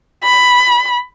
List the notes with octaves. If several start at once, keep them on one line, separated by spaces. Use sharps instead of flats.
B5